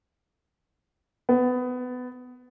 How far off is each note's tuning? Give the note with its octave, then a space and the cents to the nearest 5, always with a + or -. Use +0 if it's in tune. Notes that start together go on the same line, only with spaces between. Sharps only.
B3 +20